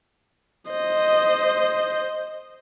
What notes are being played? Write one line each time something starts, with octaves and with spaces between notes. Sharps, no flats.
C5 D#5